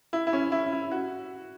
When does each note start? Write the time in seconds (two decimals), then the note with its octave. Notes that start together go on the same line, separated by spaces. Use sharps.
0.13 E4
0.27 E4
0.33 C#4
0.52 E4
0.72 E4
0.91 F#4